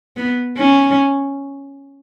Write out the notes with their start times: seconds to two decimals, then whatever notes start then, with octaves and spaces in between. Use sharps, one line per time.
0.17 B3
0.58 C#4